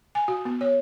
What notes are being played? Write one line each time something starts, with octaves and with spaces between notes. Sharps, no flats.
G#5
F#4
B3
C#5